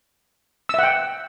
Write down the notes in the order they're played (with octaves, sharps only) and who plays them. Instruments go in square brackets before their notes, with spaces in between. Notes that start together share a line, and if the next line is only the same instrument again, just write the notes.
[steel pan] E6
E5
F#5
G5